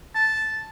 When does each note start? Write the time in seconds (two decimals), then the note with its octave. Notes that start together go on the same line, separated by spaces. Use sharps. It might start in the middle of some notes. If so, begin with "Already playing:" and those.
0.15 A5